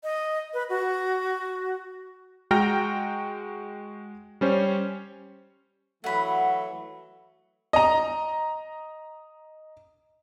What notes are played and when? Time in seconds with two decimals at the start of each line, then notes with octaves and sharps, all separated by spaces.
0.04 D#5
0.54 B4
0.70 F#4
2.51 G#3 F#4 G5 A#5 F6 A#6
4.41 G3 C#4 C5 C#5
6.04 E3 F#3 A3 F#5 B5
7.73 D#5 A#5